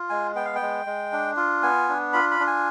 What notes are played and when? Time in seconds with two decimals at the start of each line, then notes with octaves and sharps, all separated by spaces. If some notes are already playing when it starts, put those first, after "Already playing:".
Already playing: F4
0.10 G#3 G#5
0.35 B3 G5
0.45 F5
0.55 G5
0.62 G#3
0.86 G#3
1.13 D4
1.37 F4
1.63 B3 G#5
1.89 D4
2.13 F4 B5
2.31 B5
2.40 D4
2.47 G#5